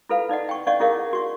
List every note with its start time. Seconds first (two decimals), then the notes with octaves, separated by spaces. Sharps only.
0.09 E4 F4 A4 B4 F5
0.29 D#4 D5 D#5 F#5
0.49 G5 C#6
0.67 C#4 D5 D#5 F5 F#5 C#6
0.80 C#4 E4 G#4 A#4 D#5 F5
1.13 F#4 C#6